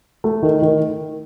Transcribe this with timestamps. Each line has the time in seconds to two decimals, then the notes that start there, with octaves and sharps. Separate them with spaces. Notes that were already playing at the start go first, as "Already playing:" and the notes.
0.24 A3
0.43 D#3
0.62 D#3